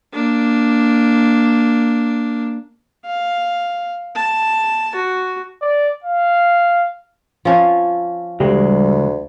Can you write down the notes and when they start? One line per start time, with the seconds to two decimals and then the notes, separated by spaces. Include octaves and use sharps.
0.14 A#3 D4
3.05 F5
4.16 A5
4.95 F#4
5.62 D5
6.04 F5
7.45 F3 C#4
8.40 D2 C#3 E3 G3 G#3